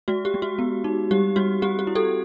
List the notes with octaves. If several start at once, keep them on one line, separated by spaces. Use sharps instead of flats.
G#3 F#4
G4
G#3
F#4
B3
D#4
G3 G4
G3 F#4
C4 G4
G4
E4
G4 A4